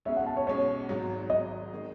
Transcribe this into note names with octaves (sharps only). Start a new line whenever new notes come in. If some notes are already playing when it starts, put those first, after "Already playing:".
B1 B2 G#3 C#4 E5
F#5
A5
C#5
B1 B2 G#3 C#4 C#5
G#1 G#2 F#3
G#1 G#2 F#3 D#5
D#3 G#3 D#4